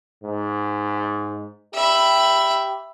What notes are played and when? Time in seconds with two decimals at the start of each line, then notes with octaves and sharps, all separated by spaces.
0.24 G#2
1.74 G4 E5 B5